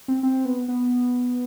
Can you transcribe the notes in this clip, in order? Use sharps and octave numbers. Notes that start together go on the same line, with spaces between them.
C4
C4
B3
B3